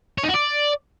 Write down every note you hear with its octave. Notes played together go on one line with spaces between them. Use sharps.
C#5
D#4
F#4
D5